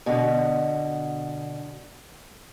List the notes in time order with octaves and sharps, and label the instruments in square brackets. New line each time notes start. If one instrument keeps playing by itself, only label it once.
[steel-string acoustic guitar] B2 D3